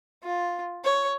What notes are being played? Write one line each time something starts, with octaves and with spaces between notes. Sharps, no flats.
F4
C#5